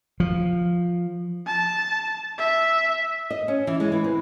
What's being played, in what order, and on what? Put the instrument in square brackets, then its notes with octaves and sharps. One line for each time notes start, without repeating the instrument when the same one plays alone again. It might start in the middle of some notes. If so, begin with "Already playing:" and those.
[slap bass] F3
[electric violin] A5
E5
[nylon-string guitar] D#5
C#4
E3
G#3
E3
C4